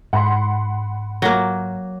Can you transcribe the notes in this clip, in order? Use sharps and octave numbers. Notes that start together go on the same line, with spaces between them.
G#2 F#5 B5 C6
F#3 A#3